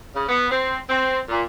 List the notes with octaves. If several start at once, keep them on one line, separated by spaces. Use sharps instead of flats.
C#3
B3
C4
C4
A#2